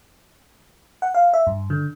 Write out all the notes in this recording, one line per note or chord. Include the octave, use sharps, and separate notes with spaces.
F#5
F5
E5
G2
D3